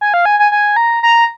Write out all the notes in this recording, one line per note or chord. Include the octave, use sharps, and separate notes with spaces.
G#5
F5
G#5
G#5
G#5
A#5
A#5